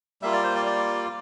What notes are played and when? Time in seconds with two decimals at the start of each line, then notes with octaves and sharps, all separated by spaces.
0.22 G3 A#3 F4 E5
0.33 D5
0.43 C5
0.55 D5
0.66 D5